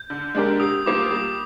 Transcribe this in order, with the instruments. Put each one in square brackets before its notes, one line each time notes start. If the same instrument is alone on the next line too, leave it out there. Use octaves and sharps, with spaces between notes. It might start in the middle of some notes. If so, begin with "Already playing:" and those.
Already playing: [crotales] G6
[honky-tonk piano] D3
G#3 D4 G4 A#4
[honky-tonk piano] C3 [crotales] D#6
[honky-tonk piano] G3 A#3 F4 [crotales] D6
[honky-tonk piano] G3 [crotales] D#6